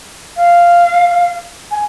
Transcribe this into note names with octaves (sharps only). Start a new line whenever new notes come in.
F5
G#5